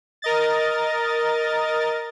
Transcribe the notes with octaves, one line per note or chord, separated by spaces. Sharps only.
A#4 D#5 A6